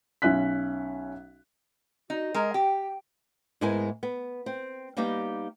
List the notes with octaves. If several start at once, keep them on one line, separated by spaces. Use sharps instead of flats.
B1 C#4 E5 F#6 B6
D#4 F#4
G#3 A#4 D#5
G4 G5
G#2 G#3 B3 E4 A#4 G#5
B3
C4
G3 A#3 B3 D#4 G4